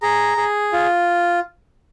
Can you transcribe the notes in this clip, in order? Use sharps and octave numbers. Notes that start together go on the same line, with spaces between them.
G#4 A#5
G#4
F4